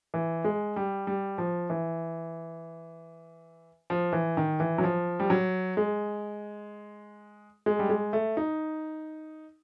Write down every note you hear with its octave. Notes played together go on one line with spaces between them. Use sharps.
E3
G#3
G3
G3
F3
E3
F3
E3
D#3
E3
F#3
F3
G3
F#3
G#3
G#3
G3
G#3
A3
D#4